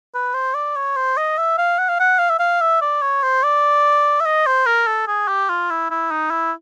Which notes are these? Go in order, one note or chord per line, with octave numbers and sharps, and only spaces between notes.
B4
C5
D5
C#5
C5
D#5
E5
F5
F#5
F5
F#5
F5
E5
F5
E5
D5
C#5
C5
D5
E5
D#5
C5
A#4
A4
G#4
G4
F4
E4
E4
D#4
E4